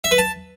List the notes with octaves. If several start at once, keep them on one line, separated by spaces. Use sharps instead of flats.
E5
B4
A5